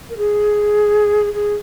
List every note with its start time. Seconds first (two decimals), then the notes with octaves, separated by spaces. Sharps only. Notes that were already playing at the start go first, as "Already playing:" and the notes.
0.09 A#4
0.17 G#4
1.33 G#4